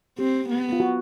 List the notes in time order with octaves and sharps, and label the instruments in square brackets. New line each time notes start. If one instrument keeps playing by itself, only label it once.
[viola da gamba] C4 [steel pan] G4
[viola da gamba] B3
[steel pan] F4
F#4